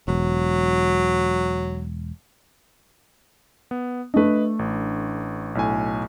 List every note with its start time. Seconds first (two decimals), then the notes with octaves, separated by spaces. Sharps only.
0.08 E1 F#3
3.71 B3
4.14 A3 D4 B4 D#5
4.59 A1
5.55 B1 A2 G#5